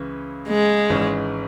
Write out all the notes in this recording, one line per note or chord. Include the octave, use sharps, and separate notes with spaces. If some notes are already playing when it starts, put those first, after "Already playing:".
Already playing: C#2 C#3 E3 C#4
G#3
G#1 G#2 E3 C#4